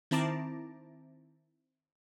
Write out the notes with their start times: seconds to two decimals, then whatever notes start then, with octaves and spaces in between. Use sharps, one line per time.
0.11 D#3 C4 E4 A5 A#5 D6